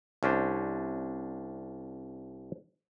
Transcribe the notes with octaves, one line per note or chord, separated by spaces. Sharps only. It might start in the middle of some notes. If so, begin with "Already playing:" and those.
C2 C#4 D4 C5